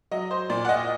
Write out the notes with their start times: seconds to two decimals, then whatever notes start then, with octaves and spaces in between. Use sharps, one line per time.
0.11 F#3 D#5
0.31 C5
0.50 A#2 D5
0.65 F#5
0.69 D#5